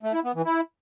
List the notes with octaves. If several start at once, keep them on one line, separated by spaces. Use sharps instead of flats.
A3
E4
B3
E3
E4